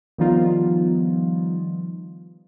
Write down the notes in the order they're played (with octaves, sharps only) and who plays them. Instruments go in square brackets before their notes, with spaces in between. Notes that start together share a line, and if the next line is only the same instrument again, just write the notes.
[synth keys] D#3 F3 G3 B3 D#4 F4